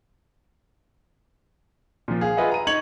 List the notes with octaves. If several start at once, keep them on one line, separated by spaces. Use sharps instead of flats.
A#2 F3
G#4 F5
F4 G#4 B4 D#5 E5 F#5
A#5 D#7
D#4 C#6 G#6 C#7 F7 F#7